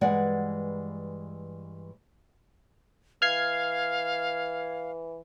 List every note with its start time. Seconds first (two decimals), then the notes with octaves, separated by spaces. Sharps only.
0.01 G2 E3 G#3 D5 F#5
3.22 E3 F5 F6 G#6 C7